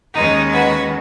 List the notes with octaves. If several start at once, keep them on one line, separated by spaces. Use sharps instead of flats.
D#2 D#3 G#3 C#4 D#4
F#4 B4